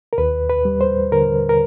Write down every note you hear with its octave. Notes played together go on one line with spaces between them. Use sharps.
A#4
D#2 B4
B4
G3
C5
D3 A#4
A#4